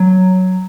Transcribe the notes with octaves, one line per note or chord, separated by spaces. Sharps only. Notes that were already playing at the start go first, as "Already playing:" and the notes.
Already playing: F#3